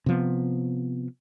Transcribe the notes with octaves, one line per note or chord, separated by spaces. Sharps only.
C3 F3 B3